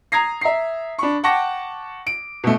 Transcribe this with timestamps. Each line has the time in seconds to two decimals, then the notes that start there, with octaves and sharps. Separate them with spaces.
0.12 A#5 D#6 G#6 A#6 C7
0.41 E5 A#5 C7
0.99 D4 B5 C#6
1.24 F#5 G5 A5 C#6 D6 A#6
2.07 D7
2.44 B2 A3